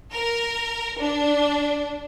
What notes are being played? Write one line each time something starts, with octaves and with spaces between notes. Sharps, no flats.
A#4
D4